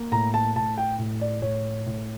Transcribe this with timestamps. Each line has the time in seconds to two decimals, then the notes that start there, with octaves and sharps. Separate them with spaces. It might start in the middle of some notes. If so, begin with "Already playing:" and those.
Already playing: A#3
0.12 A2 A#5
0.34 A5
0.56 A2 A5
0.78 G5
0.99 A2
1.21 D5
1.42 A2 C#5
1.86 A2